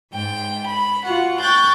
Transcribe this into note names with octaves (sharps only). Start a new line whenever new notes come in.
G#2 G5
B5
F4 F#4 F#5
G5 C#6 F#6 G6 A6